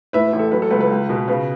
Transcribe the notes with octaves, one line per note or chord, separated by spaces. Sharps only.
A2 B4 E5
B4
A1
A4
F#3 B4
A4
C#2 B4
B4
C#2
B2
C#3 B4